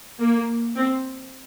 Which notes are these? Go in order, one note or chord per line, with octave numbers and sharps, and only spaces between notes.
A#3
C4